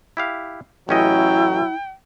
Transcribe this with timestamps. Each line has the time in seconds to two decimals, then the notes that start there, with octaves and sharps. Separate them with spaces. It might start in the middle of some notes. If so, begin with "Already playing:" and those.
0.17 E4 G4 F5
0.89 A1 F#3 C#4 E4 D#5 G5